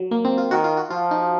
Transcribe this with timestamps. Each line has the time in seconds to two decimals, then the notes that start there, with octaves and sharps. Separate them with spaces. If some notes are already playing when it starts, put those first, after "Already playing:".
Already playing: F#3
0.11 A#3
0.25 C4
0.38 F4
0.51 D#3 F#4
0.64 F4
0.77 F#4
0.90 F3 F4
1.11 D#4